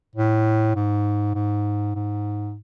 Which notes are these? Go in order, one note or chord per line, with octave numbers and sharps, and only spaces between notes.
A2
G#2
G#2
G#2